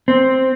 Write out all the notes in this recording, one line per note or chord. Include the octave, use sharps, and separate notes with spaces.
C4